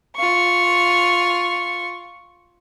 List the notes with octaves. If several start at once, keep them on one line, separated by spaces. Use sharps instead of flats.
F4 C#6